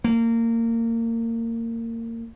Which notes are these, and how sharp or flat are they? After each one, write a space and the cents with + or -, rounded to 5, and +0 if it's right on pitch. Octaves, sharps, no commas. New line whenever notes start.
A#3 -25